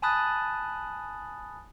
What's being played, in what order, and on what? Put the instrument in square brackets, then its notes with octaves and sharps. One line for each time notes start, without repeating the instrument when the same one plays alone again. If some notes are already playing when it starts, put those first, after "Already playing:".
[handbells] G#5 A5 B5 D#6 F#6 A6